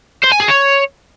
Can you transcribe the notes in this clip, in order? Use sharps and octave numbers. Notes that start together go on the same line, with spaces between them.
C5
G#5
G#4
C#5